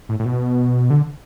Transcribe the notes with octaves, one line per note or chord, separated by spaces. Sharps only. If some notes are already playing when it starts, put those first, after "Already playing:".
A2
A2
B2
D3